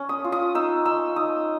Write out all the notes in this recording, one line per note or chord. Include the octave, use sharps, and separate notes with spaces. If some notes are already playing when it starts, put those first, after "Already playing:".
Already playing: C#4
D#6
F4
D#6
D#4 E6
D#4 E6
D#4 D#6